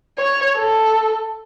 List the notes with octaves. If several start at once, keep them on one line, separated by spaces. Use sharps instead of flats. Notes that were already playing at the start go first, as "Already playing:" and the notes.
C#5
A4